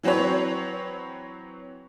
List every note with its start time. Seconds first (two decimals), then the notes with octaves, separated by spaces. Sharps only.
0.03 E3 F#3 C4 F#4 B4 C#5